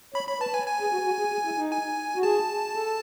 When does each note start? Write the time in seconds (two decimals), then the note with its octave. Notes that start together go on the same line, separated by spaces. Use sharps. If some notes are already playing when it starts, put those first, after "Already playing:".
0.14 C#5 B5
0.28 C#5 B5
0.40 B4 A5
0.53 B4 G#5
0.67 G#5
0.80 G#4
0.92 F#4
1.05 F#4
1.19 G#4
1.32 G#4
1.45 E4
1.58 D#4
1.71 G#5
2.16 F#4
2.23 G#4 A5
2.75 A4